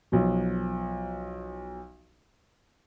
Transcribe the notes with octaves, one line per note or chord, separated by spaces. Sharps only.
B1 F3